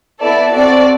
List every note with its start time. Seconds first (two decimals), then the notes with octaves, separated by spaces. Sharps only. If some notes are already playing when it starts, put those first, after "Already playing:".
0.21 B3 E4 A4 D5
0.53 C4 F#4 A4 D5